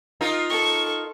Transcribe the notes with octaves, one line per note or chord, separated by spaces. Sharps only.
D#4 F4 A#4
A4 C#6